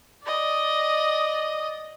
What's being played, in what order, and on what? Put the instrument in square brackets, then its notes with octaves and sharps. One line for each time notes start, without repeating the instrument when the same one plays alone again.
[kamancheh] D5 D#5